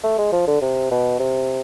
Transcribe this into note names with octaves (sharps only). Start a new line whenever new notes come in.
A3
G#3
F3
D3
C3
B2
C3